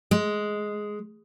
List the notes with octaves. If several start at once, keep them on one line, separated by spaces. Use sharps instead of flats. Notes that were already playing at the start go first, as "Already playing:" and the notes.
G#3